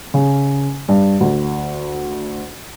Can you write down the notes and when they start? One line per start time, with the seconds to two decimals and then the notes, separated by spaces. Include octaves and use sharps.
0.14 C#3
0.88 G2
1.21 D2